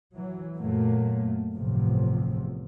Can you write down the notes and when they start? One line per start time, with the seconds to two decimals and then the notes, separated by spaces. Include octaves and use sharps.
0.14 E3 F#3
0.55 F#2 A#2 F#3 A3 A#3
1.53 G1 E2 A2 C3 F3